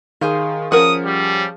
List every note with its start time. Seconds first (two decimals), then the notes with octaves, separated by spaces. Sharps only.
0.21 D#3 G#4 C5 F5
0.72 F3 C#4 A#4 F#5 D#6
1.05 G3